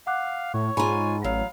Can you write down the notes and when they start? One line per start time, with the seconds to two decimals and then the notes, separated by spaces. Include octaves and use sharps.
0.07 F5 F#5 D6 F#6
0.54 A2 C#5
0.77 G#2 F4 G#5 A#5 B5
1.24 A1 F#3 F5